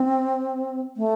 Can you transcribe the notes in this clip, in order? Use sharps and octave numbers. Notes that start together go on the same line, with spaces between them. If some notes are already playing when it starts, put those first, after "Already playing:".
Already playing: C4
A3